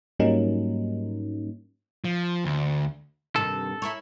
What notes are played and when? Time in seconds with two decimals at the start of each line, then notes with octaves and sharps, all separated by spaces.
0.19 G#2 F#3 G3 A#3 C#4 D#4
2.04 F3
2.44 D2
3.36 G2 C3 D#3 A4
3.82 E4 A#4 C#5